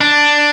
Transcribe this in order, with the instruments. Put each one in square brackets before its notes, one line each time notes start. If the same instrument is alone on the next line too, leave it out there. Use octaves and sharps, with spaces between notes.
[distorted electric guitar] D4